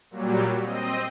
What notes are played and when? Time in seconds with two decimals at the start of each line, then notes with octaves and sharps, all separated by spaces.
0.11 A#2 F#3 G3
0.62 C4 D#5 D#7